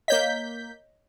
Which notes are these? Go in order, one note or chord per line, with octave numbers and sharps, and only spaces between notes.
A#3 C#5 D#5 G6 B6